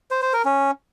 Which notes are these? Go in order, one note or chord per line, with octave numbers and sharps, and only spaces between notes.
C5
C5
A#4
C#4